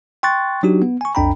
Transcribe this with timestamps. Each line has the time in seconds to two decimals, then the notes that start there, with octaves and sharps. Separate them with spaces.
0.23 G5 C6 C#6 F#6 A6
0.63 F#3 D4 D#4 F#4 G4
0.82 B3
1.01 G#5 C#6
1.15 B1 F2 D4 G5 A#5 B5